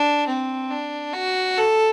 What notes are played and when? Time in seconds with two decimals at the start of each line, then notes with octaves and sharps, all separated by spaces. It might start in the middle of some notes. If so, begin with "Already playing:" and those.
Already playing: D4
0.28 C4
0.70 D4
1.13 F#4
1.57 A4